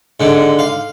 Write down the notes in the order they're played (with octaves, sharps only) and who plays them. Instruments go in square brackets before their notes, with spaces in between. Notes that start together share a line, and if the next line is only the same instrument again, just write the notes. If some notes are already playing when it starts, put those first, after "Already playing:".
[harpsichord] G#2 D3
F5